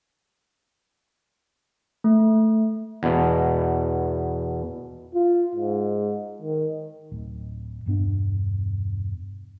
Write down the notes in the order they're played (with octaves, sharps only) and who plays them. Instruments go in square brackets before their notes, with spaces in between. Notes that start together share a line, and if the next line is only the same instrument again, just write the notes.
[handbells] A3
[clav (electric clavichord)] E2 B2
[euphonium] F4
G#2
D#3
[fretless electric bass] D1
E1 G2 B3 D4